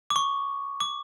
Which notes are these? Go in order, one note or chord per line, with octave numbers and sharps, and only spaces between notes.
D6
C#6
D6